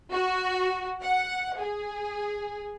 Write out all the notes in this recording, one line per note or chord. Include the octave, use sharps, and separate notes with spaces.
F#4
F#5
G#4